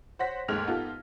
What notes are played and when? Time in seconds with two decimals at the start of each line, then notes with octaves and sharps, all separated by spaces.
0.19 C5 C#5 F#5 C6 A#6 B6
0.48 D#2 G#2 A3 F6 G#6 F7
0.67 B3 D#4 F4 G4 A4